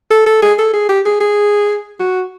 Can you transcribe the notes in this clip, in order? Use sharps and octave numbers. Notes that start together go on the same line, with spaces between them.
A4
A4
G#4
A4
G#4
G4
G#4
G#4
F#4